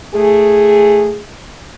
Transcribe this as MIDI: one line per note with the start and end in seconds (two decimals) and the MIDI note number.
0.15 1.20 45
0.15 1.20 57
0.15 1.20 68